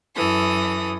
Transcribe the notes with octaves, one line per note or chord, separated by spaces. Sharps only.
F#2 E3 A4 D#6